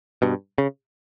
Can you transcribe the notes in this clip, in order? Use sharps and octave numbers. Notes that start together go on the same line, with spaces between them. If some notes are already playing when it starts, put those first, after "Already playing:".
G2 B2
C#3